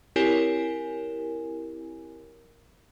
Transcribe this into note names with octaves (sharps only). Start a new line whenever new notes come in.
C4 E4 G4 A#4 C#5 G#5